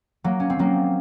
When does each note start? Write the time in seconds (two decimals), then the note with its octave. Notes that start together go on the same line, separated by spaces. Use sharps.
0.24 F#3 A#3
0.40 C#4
0.50 C4
0.59 F#3 A#3